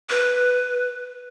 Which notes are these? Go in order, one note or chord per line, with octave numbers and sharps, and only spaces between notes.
B4